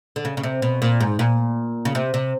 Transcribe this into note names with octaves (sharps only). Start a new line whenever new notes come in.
D3
C#3
C#3
C3
B2
A#2
G#2
A#2
C#3
C3
C3